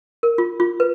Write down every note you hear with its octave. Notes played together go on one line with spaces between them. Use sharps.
A#4
F4
F4
B4